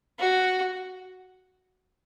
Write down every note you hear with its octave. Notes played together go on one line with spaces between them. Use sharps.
F#4